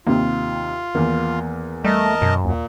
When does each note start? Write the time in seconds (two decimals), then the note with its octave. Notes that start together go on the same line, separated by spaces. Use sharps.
0.07 D#2 C3 A#3 F4
0.95 E2 D#3 A#3
1.84 G3 A3 A#4 D#5 A5
2.21 F#2 B2
2.45 D#2 A#2